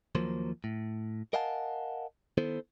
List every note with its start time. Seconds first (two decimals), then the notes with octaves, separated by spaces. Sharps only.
0.15 D#2 F3 F#3 A#3 C5
0.64 A2
1.33 A#4 D#5 F5 F#5 G#5 A5
2.38 D#3 B3 E4 A4 C5